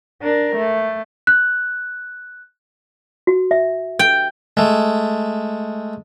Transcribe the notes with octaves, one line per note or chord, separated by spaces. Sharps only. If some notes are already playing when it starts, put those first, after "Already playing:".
D4 A#4
A3
F#6
F#4
E5
G5
G#3 A3